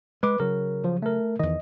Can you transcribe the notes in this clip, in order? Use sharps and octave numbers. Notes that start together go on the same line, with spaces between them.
G#3 B4 D6
C#3 F#3 A#4
F3
A3 A#4
E2 D#3 D#5